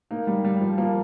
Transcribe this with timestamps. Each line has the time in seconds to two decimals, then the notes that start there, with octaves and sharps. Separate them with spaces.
0.11 A#3 D#4
0.27 G3
0.45 G3
0.61 F3
0.78 F3 A#3